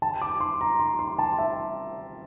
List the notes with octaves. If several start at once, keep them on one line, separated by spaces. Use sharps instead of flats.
A5
D6
C6
A#5
C6
C6
A5
E5